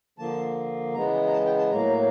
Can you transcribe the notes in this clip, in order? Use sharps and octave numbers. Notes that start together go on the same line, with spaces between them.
D3 F3 A#3 A5
C#3 E3 G#3 B3 A#5
A#5
A5
G5
A5
A2 F#3 A#3 A#5